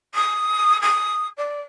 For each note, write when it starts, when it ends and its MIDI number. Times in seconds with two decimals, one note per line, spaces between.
0.14 0.80 87
0.81 1.27 87
1.37 1.60 74